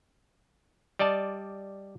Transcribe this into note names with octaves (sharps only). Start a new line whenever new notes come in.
G3 D5 D#5 A5